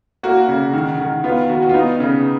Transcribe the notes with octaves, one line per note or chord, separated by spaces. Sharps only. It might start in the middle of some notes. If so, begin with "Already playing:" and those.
A#3 F#4
C#3
D#3
D#3
B3 F4
D#3 F#4
F#4
F4
B3 D#4
C#3